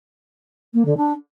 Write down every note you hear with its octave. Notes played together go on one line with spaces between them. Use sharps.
A#3
D3
D4